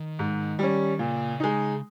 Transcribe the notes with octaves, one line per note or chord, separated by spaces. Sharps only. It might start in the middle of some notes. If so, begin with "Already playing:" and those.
Already playing: D#3
G#2
G3 C#4
A#2 C#3
G#3 D#4